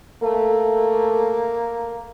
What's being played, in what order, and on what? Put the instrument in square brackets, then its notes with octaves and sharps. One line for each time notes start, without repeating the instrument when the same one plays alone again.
[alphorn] A3 [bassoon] A#3